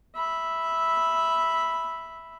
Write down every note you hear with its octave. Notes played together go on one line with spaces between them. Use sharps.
E5 B5